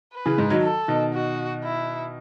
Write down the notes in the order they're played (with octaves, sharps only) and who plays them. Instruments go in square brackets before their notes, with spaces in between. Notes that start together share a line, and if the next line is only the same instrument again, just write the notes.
[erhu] B4
[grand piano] C#3 E3
G#2
D#3 F#3
[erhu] A4
[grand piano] B2 D#3
[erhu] F#4
E4